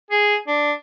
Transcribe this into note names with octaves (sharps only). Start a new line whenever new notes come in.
G#4
D4